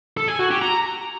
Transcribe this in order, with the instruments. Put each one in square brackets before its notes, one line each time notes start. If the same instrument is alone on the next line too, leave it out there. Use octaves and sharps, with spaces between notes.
[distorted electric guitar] A4
G#5
F#4
G4
A#5